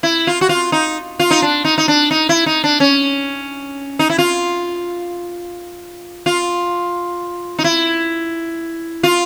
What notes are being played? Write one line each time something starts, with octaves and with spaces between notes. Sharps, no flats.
E4
F4
F#4
F4
D#4
F4
D#4
D4
D#4
D#4
D4
D#4
E4
D#4
D4
C#4
D#4
E4
F4
F4
D#4
E4
F4